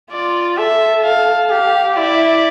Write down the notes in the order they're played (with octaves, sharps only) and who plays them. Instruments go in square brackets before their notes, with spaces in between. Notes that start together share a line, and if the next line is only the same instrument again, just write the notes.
[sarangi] F4 [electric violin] D5
[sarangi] A4 [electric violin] E5
[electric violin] F5
[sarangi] G4 [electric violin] F5
[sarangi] E4 [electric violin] D5